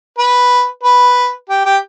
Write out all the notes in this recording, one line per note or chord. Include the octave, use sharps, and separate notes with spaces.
B4
B4
G4
G4